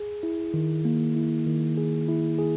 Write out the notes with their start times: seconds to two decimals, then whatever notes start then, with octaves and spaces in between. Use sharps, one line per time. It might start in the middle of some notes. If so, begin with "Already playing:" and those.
Already playing: G#4
0.23 E4
0.54 D#3
0.85 A#3
1.16 E4
1.47 D#3
1.77 G#4
2.08 E4
2.39 G#4